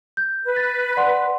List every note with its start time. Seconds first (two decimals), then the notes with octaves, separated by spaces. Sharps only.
0.17 G6
0.44 B4
0.56 A6
0.97 D5 F#5 C6